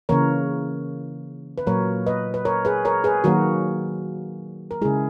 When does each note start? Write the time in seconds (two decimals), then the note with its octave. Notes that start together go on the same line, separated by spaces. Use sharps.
0.09 C#3 E3 A#3 A#4 C#5
1.58 B4
1.67 A#2 F#3 A#3 A#4 C#5
2.07 B4 D#5
2.34 B4
2.45 A#4 C#5
2.65 G#4 B4
2.85 A#4 C#5
3.04 G#4 B4
3.24 D#3 F#3 A#3 F#4 A#4
4.71 A#4
4.81 C#3 G#3 E4 G#4